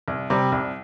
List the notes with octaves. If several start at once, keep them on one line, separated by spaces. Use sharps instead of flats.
C2
C3 G3
C2